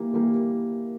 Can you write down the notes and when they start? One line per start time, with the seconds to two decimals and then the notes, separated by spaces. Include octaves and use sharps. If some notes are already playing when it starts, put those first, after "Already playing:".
Already playing: E3 G3 A#3
0.14 E3 G3 A#3